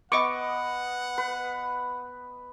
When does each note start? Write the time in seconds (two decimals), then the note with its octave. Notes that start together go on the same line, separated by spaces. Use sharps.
0.12 B3 D#5 F#5 C#6 D6
1.18 B4